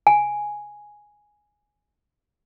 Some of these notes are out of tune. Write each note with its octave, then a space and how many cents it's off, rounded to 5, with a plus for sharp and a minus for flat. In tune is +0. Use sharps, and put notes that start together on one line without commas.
G#5 +0